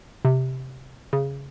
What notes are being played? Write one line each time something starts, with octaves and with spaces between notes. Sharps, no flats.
C3
C#3